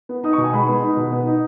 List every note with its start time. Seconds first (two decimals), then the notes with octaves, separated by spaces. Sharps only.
0.09 B3
0.24 D#4 D#6
0.33 C#6
0.38 B2
0.44 G#5
0.53 G#3 B5
0.68 B3
0.82 D#4
0.97 B2
1.12 B3
1.26 D#4